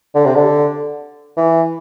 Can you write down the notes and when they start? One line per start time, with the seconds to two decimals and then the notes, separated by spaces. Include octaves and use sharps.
0.15 D3
0.25 C3
0.35 D3
1.37 E3